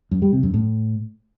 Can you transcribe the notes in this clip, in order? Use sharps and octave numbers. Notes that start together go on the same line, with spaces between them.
F#2
G3
C3
F#2
A2